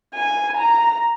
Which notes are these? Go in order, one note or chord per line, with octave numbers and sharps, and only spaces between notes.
G#5
A#5